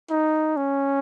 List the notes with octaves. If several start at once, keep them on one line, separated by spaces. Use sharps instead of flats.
D#4
C#4